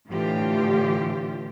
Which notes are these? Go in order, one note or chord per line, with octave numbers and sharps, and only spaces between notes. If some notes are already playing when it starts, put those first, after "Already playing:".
A2 D3 E3 F4 G4